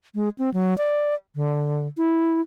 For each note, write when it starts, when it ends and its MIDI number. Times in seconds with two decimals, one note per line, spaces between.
0.15 0.29 56
0.38 0.50 60
0.54 0.76 54
0.78 1.14 74
1.35 1.87 50
1.97 2.41 64